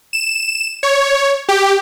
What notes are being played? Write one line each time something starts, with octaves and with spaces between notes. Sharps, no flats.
E7
C#5
G4